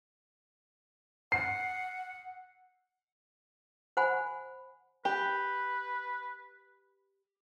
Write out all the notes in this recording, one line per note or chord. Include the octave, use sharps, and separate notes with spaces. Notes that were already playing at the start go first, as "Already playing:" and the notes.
F#5 C7
C5 F#5 G#5 B5
G4 B4